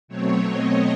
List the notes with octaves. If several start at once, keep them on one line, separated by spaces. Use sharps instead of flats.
B2 F#3 A3 C4 C#5
D#5